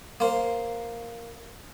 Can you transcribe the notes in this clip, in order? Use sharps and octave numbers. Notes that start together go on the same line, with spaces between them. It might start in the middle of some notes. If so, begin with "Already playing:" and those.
A#3 C5